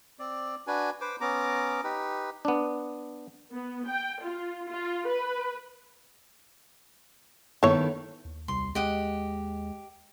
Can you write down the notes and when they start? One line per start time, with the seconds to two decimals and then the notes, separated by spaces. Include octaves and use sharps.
0.19 C4 D5
0.67 D4 F#4 B4 G#5
1.01 B4 C5 D6
1.21 B3 C#4 A#5 D6
1.84 D#4 G4 B4
2.45 B3 D4
3.52 B3
3.87 G5
4.23 F4
4.69 F4
5.08 B4
7.63 D#3 B3 E4 A4 C#5
8.25 D#2
8.48 C2 C6
8.75 G#3 G4 D#5 F#5